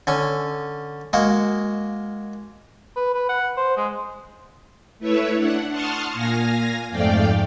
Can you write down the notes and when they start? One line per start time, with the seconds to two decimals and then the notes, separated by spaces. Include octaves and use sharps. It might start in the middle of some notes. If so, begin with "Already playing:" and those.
0.07 D3 C#4 G#5
1.13 G#3 A#3 F#4
2.96 B4
3.14 B4
3.29 F#5
3.57 C5
3.77 G#3
4.99 A3 E4 B4 C#5 E5
5.33 D4 F#5
5.69 F#5 A5 C6 C#6 D#6 F6
6.11 A#2 F5 G#5 A#6
6.90 F2 G#2 A3 D5 F5 G5